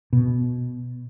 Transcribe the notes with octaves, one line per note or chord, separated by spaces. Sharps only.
B2